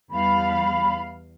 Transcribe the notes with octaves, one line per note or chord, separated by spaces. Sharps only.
E2 G3 F5 B5